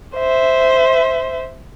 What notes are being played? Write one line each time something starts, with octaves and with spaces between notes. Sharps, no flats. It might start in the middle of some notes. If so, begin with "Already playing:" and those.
C5 E5